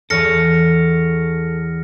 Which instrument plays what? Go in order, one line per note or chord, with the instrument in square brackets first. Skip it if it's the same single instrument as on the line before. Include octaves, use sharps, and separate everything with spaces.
[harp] E2 [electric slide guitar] A4 C#5 [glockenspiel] F6 A#6 C#7